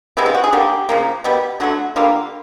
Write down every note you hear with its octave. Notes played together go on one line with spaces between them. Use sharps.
C3 E3 G#3 B3 E4
F4
F#4
G#4
D3 G3 A#3 G4
C#3 F3 A#3
B2 G3 B3
D3 F#3 A3 F#4
D3 G3 A#3 F4